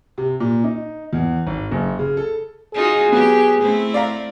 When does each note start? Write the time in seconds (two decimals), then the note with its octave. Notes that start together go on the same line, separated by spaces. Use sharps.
0.18 C3
0.40 A#2
0.64 D#4
1.13 E2
1.47 G#1
1.71 F#1
1.99 C#3
2.17 A4
2.74 D#4 F4 F#4 G#4
3.12 F#3 B3 G4
3.60 A3 C4 E4
3.94 D5 F5 A#5